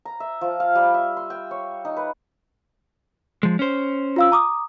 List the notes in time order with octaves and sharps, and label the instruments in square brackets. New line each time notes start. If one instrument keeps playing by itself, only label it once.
[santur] A#5
E5
F3
F5
G3
E5
C6
G5
C#5
D#4
B4
[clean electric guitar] F3 G#3
C#4 C5
[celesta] F4 F5 E6
A#5 D6 D#6